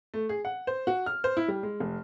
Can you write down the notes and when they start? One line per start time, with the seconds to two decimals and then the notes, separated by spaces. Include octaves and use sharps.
0.14 A3
0.29 G#4
0.45 F#5
0.67 C5
0.87 F#4
1.06 F6
1.24 C5
1.37 E4
1.48 G3
1.63 G#3
1.80 F1